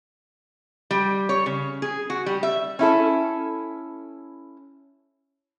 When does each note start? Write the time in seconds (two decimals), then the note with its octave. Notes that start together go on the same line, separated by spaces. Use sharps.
0.91 G3
1.29 C#5
1.46 C#3
1.82 G#4
2.10 F#4
2.26 G3
2.43 E5
2.79 C#4 E4 A4